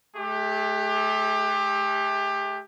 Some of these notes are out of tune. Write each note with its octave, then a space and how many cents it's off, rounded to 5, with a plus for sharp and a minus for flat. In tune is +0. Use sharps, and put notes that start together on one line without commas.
A3 -35 G4 +20